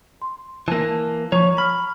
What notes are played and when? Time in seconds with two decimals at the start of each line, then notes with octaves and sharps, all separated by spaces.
0.22 C6
0.68 E3 A#3 A5
1.32 F3 C#5 A#5 C#6
1.58 B5 F6